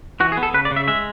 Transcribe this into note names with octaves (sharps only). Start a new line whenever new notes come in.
E3 F#4
G#4
B3
A4
C#3 B4
D5
C#3
E5
G#3 E5